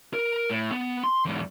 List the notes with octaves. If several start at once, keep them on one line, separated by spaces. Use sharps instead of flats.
A#4
A2
B3
C6
E2 G#2